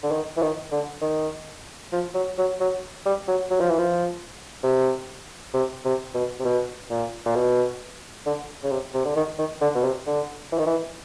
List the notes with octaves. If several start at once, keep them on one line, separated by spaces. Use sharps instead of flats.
D3
D#3
E3
D#3
D3
D#3
F3
F#3
F#3
F#3
G3
F#3
F#3
F3
E3
F3
C3
C3
C3
B2
C3
B2
A#2
A#2
B2
D3
C#3
C3
C3
D3
D#3
D#3
D3
B2
C3
D3
E3
D#3
E3